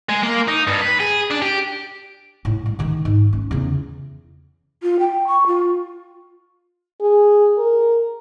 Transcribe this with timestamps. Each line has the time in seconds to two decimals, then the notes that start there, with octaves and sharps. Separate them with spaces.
0.09 G#3
0.23 A#3
0.48 D#4
0.68 G2
0.82 B4
1.00 G#4
1.30 D4
1.42 G4
2.45 A2
2.66 G3
2.79 D3 D#3
3.05 G#2
3.33 C#4
3.51 E2 C#3
4.83 F4
4.99 G5
5.27 C#6
5.47 F4
7.01 G#4
7.58 A#4